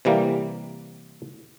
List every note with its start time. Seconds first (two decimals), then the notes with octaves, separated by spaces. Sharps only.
0.05 C3 E3 G3 A#3